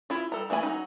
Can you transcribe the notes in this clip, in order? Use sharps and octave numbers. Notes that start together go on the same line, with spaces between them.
E4 F4
G3 A4 A#5
E3 A3 D4 G#5 B5
F#3 D#4